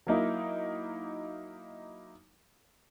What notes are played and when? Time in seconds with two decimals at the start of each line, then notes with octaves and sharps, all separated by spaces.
0.07 F#3 A#3 D#4 E4